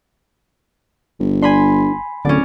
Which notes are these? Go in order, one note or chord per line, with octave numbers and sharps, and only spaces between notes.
G1
D4 G#5 B5 C6
D1 D3 C#4 D5